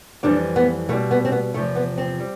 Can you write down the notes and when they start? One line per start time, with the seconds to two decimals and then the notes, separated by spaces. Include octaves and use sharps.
0.23 F2 E3 G3 D4
0.56 B3
0.89 B2 A3
0.93 G3
1.11 B3
1.25 C4
1.32 B3
1.54 E2 C3 F3 A3
1.75 B3
1.98 C4
2.20 G3